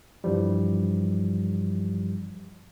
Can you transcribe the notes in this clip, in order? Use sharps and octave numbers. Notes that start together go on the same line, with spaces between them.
G2 E3 F3 G3